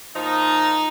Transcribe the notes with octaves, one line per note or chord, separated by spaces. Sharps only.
A#2 F3 D#4